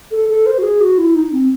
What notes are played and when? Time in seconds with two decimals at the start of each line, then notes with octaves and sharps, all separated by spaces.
0.11 A4
0.29 A4
0.46 C5
0.58 F#4
0.63 G#4
0.80 F#4
0.98 E4
1.15 D#4
1.33 C4